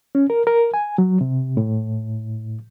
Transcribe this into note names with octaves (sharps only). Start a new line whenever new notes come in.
C#4
A#4
A#4
G#5
F#3
C3
A2